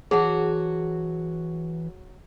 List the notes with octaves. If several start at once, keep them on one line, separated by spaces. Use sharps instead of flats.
E3 F#3 F#4 G#4 F#5 A5